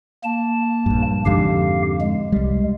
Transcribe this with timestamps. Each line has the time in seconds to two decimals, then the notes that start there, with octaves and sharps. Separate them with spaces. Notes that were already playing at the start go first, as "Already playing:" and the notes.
0.24 A#3 A5
0.86 A#1 G2
1.26 F2 G#2 D3 G4 F5
2.01 G#3
2.32 C2 G3